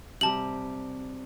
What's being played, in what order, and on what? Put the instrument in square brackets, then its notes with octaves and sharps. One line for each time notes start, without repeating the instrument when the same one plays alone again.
[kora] C3 G3 [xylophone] A5 F#7